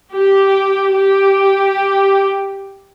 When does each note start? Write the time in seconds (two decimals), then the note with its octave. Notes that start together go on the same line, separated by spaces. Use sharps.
0.13 G4
0.92 G4